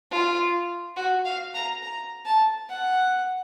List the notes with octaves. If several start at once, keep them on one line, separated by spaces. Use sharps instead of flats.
F4
F#4
F5
A#5
A#5
A5
F#5